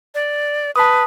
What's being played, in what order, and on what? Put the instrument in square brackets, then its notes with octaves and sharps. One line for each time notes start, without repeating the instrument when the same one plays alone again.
[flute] D5
[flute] B4 [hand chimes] A5 D#6